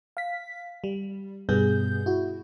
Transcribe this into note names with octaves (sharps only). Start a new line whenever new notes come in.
F5 B6
G3
G2 B2 G3 B3 G#4 G6
E4 F#4